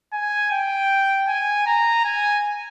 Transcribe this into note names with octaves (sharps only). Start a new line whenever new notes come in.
G#5
G5
G#5
A#5
G#5